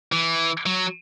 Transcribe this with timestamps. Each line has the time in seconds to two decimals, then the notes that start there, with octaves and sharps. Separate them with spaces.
0.12 E3
0.66 F#3